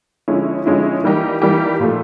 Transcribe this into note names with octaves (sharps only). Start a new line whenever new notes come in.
D3 F3 G#3 C#4 E4
D3 F3 G#3 C#4 E4
E3 G3 A#3 D#4 G4
E3 G3 A#3 D#4 G4
A#2 F3 A3